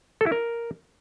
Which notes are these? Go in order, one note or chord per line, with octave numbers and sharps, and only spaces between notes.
A4
E4
A#4